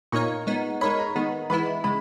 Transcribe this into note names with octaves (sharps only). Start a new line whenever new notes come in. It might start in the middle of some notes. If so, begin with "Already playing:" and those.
A#2 A#3 D#4 A#4 C#5 C#6
G#3 B3 D#4
G#3 D#4 A#4 C#5 B5
A#5
D#3 G#3 B3 D#4
E3 G#3 B3 E4 B5
C#3 G#3 B5